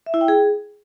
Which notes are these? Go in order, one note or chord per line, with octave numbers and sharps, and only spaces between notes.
E5
E4
G5
G#4